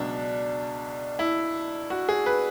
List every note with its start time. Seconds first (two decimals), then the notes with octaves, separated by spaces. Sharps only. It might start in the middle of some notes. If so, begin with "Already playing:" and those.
Already playing: C#2 B2 F#3 D4
1.19 E4
1.90 F#4
2.09 G#4
2.26 B4